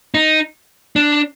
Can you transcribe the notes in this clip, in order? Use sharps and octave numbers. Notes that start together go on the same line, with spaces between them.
D#4
D4